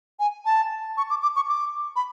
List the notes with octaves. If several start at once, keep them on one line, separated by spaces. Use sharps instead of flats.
G#5
A5
C#6
D6
D6
C#6
D6
B5